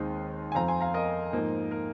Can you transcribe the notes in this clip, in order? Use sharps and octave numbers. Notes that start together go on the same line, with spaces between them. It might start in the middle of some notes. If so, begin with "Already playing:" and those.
Already playing: D#2 D#3 G#3 C4 D#4 C6
G#5
F2 F3 C4 F5 A#5
G#5 C6
F5 A#5
A#4 D#5
G#2 F3 A#3 D#4
A#4